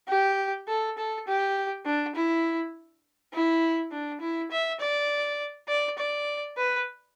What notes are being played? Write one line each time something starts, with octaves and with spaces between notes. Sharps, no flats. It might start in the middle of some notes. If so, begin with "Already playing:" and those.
G4
A4
A4
G4
D4
E4
E4
D4
E4
E5
D5
D5
D5
B4